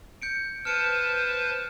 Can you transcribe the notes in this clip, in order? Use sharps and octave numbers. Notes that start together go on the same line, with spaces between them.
G6 C#7 D7
B4 C5 A5 F6 C#7 D7